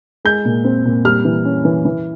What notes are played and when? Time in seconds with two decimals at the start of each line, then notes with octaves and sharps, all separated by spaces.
0.25 G#3 G6
0.45 A#2
0.64 C4
0.85 A#2
1.05 G3 F6
1.25 E3
1.45 C#4
1.65 E3
1.85 E3